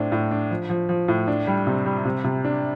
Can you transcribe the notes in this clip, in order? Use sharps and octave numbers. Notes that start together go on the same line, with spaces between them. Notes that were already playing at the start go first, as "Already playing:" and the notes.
Already playing: A2 C4 D4
A2
D4
F3
F3
F3
A2
D4
G3
C3
G3
C3
C3
D4